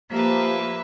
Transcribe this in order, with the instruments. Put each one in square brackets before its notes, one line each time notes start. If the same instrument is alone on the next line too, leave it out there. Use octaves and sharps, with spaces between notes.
[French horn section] A#2 F3 [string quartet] A#3 [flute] G4 [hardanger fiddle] B4 E5